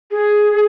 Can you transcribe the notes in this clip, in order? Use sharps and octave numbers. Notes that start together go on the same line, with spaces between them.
G#4